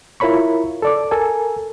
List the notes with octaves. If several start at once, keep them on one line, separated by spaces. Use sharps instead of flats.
E4 F4 A#4 C#5 B5 C#6
A4 D5 D6
A4 A#4 G#5